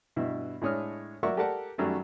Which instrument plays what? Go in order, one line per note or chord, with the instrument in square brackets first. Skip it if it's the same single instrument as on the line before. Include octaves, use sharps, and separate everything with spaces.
[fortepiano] G2 B2 E4
A2 G#3 D4 C#5 D#6 F6
F#3 A#4 D5 E5 F#5 C#6
G4 A4 A#4 D5 F#5 A5
F#2 D#3 F#3 G3 A3